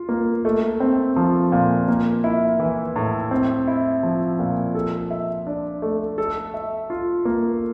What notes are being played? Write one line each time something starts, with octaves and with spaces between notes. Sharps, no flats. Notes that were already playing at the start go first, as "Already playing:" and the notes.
Already playing: F4
A#3
A3
C4
F3
A#2
A#3
E4
E3
A2
C4
E4
F3
A#2
A4
E5
D4
A3
A4
E5
F4
A#3